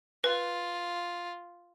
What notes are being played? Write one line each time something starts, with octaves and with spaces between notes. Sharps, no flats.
F4 B4